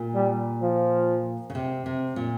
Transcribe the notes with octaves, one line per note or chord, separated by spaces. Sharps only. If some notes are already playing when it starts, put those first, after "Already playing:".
Already playing: A#2
G3
F3
C#3
C3
C3
A#2